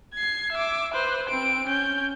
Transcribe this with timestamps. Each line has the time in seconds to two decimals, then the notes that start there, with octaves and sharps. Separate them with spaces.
0.14 G#6 C7
0.52 E5 D6
0.93 B4 C5
1.29 C4 D7
1.66 C#4 G6